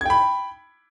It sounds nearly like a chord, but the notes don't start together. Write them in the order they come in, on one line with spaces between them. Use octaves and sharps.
G#6 G5 B5